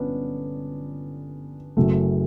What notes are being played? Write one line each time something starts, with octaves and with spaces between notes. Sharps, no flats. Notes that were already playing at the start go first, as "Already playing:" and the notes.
Already playing: G1 B3 C#4 D4
F#1 F#2 C#3 F#3 A3